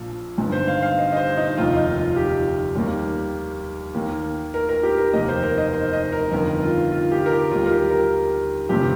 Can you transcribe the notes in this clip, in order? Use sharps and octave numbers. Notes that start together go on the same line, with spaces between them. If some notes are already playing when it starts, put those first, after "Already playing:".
Already playing: A#1 A#2 F3
G1 G2 D#3
C5
F5
F5
D#5
D#5
C5
D#4
F1 D#2 D#3 A#3 F4
D#4
F4
G4
D#2 D#3 G3 A#3
D#2 D#3 A#3
A#4
A#4
G4
A#4
F1 D#2 D#3 A#3 D#5
C5
A#4
D#5
C5
D#5
A#4
G1 F2 D#3 A#4
F4
F4
G4
A#4
G4
D#2 D#3 G3 F4
A#4
G4
A#4
G1 F2 C3 F3 A#3 G4